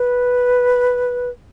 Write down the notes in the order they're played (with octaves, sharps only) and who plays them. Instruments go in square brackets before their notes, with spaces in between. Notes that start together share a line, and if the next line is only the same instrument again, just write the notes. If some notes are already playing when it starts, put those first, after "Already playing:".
Already playing: [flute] B4